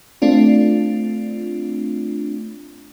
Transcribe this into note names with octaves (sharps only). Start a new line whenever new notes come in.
A3 C4 D4 F4